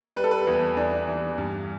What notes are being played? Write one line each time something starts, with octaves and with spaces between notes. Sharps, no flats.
G3 B4
A4
B4
E2
D4
E3
G2